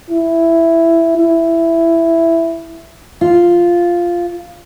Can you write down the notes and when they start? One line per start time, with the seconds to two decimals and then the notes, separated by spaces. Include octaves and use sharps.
0.10 E4
1.18 E4
3.21 F4